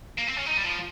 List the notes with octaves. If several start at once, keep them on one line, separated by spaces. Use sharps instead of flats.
A#3
C4
C#4
D#4
G3
F3